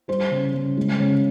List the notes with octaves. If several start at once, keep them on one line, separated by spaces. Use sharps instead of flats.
G3 C5
C#3
C#3
G#3
C#3